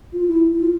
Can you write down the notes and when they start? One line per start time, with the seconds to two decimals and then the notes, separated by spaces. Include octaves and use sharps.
0.13 F4
0.28 E4
0.53 E4
0.61 F4